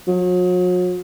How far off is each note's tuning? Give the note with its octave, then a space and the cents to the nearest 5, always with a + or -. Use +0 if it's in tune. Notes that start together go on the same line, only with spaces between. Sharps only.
F#3 -40